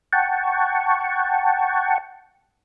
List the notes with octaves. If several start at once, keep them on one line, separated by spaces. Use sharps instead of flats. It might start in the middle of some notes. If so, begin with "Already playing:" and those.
F#5 G5 A5 C#6